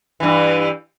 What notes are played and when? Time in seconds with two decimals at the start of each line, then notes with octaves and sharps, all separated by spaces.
0.20 G2 E3